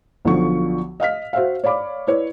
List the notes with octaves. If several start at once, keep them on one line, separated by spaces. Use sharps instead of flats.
B1 D3 F3 C#6
D#5 F5 F6 B6
F#4 C5 E5 F5
C#5 D5 F5 B5 D6
E4 B4 C#5 D5